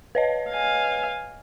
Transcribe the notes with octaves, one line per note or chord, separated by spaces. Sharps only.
B4 C#5 D#5
F5 G#5